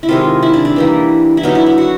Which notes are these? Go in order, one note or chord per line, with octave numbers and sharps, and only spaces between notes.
E4
C3 D#3 G#3 F4
E4
D4
D4
E3 G3 A#3
E4
D3 F#3 B3 D#4
E4
E4
F#4